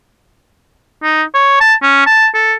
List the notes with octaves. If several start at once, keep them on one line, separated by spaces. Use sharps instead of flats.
D#4
C#5
A5
C#4
A5
A4